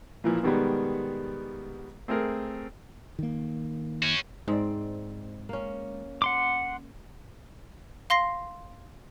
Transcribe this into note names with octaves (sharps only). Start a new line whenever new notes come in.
A#2 E3 F3
B2 D#3 G3 G#3 B3
A3 C4 G#4 A#4
D#3 A#3
C#4 F#4
G#2 G#3 C4 D5
A#3 C#4
F#5 C6 D6
F5 C6 A#6 C7